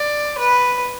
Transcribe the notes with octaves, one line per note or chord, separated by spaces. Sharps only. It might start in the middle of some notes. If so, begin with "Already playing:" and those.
Already playing: D5
B4